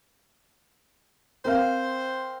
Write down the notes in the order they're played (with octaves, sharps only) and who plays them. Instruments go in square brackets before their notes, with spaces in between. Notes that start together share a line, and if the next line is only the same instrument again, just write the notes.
[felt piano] C4 A#4 F5 [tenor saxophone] C5